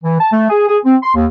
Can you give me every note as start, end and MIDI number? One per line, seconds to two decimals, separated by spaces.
0.04 0.16 52
0.20 0.31 81
0.32 0.48 57
0.50 0.65 68
0.68 0.78 68
0.84 0.96 60
1.03 1.14 84
1.15 1.27 39